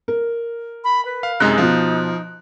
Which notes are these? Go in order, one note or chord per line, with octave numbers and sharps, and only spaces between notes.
A#4
B5
B4
F5
F#2 C3 G#3 D#4 F#6
B2 F3 F4